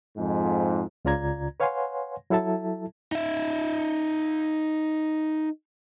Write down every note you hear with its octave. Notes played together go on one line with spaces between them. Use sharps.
F2 G#2
C#2 C#3 F4 D5 A#5 G#6
B4 C#5 F5 F#5 G#5 C6
F#3 E4 A4 E5 A5
D#4 E5